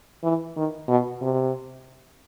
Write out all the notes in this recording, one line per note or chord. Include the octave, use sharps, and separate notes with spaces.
E3
D#3
B2
C3